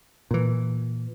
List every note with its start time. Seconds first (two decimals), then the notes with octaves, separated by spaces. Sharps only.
0.31 A#2 E3